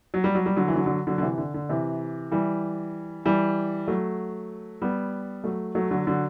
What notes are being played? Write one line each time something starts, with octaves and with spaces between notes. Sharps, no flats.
F#3
G3
F#3
G3
D3 F#3
E3
D3 F#3
D3 F#3
D3 F#3
D3
C3 E3
D3
D3
C3 E3
E3 G3
E3 G3
F#3 A3
G3 B3
F#3 A3
F#3 A3
D3 F#3
D3 F#3